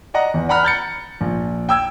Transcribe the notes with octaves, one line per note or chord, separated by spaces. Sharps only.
D5 D#5 F#5 A#5
E2
D5 F#5 A#5 B5 F6 F#6
A#5 G6 A6 C#7
A#1
G5 E6 G#6